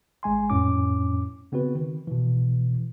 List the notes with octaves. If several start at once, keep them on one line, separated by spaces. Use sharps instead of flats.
G#1 G#3 G#5 C6
F2 A2 C#4 D6
C#3 B3 C4 F#4 B4
D#3
B2 E3